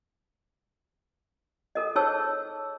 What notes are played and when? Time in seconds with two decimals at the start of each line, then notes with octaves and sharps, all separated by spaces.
1.75 A4 A#4 D#5
1.96 D#4 G#4 C5 C#5 A5 E6